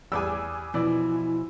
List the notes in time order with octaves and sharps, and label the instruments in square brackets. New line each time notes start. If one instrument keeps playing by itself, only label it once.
[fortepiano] E2 G3 [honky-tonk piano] G#5 D6 E6
[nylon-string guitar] B2 F3 [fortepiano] E3 D5 [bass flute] E4